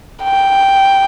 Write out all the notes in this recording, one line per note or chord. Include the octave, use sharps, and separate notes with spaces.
G5